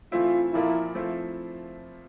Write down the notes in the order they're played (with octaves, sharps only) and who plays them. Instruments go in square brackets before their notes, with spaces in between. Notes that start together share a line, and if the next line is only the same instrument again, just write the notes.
[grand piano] E3 A3 C4 E4 [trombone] F4
[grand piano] A#2 F3 A#3 [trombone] E4
[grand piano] F3 A3 C4 E4